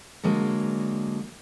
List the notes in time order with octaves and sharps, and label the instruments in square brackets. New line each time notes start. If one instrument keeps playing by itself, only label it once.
[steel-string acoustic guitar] D3 F#3 G#3 A#3